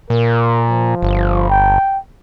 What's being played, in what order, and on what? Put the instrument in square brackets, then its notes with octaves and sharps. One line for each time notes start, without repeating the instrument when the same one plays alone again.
[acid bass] A#2 [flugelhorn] A#4
[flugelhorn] F3
[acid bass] G1
[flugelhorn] G5